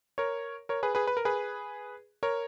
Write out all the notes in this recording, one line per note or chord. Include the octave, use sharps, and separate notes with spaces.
A#4 C#5
A#4 C#5
G#4 B4
G#4 B4
B4
A#4
G#4 B4
A#4 C#5